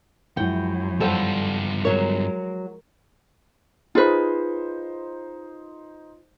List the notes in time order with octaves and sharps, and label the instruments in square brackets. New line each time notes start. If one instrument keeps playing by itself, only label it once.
[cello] F#2 [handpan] F3 G#3 E4 [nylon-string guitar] F#5 G5
[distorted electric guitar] G2 F4 [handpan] F3 F#5 [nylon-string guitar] G3 A4 C5
[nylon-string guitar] F#3 C#5 [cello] G#3 [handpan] A#4
[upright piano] D#4 C5 [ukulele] F4 G#4 B4